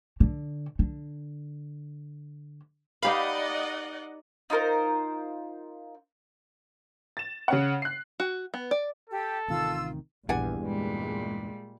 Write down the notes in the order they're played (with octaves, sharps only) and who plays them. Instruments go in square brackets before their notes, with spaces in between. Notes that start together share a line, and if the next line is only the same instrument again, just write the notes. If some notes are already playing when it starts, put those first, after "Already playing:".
[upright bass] D3
D3
[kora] D#4 G4 B4 [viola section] D5 D#5 F#5 [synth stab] F5 B5
[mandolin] D#4 F4 A#4 C5
[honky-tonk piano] A6 E7
C#3 C#4 F#5
F#6 C7
[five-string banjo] F#4
B3
D5
[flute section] G4 [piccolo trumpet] A4
[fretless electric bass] A1 C3 D#3 [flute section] F4 E6
[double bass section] A#1 [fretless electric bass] E2 G2 [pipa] D5 F#5 G#5
[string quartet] A#2 G3 [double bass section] G#3